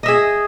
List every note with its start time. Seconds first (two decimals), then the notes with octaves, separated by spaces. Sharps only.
0.03 D#5
0.06 E5
0.08 G#4